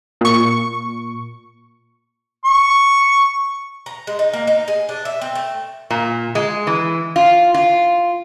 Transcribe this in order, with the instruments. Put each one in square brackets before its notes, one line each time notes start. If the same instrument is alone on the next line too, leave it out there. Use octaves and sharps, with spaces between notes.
[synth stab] A#2 C#6
[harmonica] C#6
[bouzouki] A#5
G#3
D#4
A#3
D#4
G#4
D4
E5
C4
A3
[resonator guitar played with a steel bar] A#2
G#3
E3
F4
F4